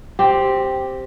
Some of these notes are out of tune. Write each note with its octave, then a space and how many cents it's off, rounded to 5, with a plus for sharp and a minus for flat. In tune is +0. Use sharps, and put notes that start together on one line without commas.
C4 +0 G4 +0